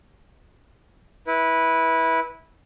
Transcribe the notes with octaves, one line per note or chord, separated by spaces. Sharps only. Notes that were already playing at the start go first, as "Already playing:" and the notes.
E4 B4